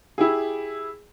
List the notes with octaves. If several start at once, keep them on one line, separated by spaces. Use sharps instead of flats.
E4 G4 G#4